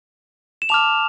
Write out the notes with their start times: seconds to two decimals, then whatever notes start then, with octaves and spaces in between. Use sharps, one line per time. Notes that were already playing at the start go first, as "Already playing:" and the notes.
0.62 E7
0.69 A5 D6 F6 F7